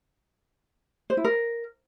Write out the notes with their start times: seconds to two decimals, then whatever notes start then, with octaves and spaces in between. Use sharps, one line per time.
1.10 C5
1.17 E4
1.24 A#4